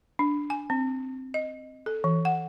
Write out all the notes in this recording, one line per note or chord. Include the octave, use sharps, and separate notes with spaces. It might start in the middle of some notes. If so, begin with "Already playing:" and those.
D4
G#5
C4
D#5
A4
E3
F#5